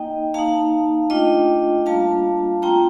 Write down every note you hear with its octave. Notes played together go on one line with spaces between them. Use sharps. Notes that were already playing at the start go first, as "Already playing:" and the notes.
Already playing: A#3 D#4 D#5 G5
A#3 D#4 F5 A5
A3 D4 F4 D#5 G5
G3 A#3 D4 F4 F5 A5
A3 C4 F4 G5 A#5